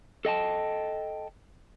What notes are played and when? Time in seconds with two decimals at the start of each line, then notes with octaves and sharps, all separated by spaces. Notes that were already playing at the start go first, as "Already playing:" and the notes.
0.25 A4 D#5 G5 A5